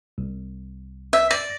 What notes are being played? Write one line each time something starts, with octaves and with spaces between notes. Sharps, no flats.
C2
E5
D5 A#6